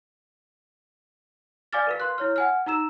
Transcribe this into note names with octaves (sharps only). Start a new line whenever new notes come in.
D5 F5 G#5 D6 F6 A6
A#4 B4 F5
C6 F#6
E4 C#5 F6
F#5 G#5 F6
D#4 A#5 E6 E7